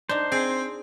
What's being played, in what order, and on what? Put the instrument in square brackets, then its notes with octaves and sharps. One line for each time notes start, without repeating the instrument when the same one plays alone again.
[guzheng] D4 D#4 [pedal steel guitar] C5
[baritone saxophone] C4 [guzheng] G#4